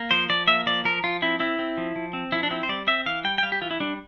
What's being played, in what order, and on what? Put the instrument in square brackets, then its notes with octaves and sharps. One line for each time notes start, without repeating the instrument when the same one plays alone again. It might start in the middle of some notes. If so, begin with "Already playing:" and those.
Already playing: [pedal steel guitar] A#3
F3 C5
F3 D5
A#3 E5
F3 D5
F3 A#4
F3 F4
C4 E4
C4 E4
C4
F3
F3
C4
F3 E4
D4
C4 E4
C5
G3 D5
C4 E5
E3 F5
G3 G5
G5
G3 F5
G4
E3 F4
E4
G3 D4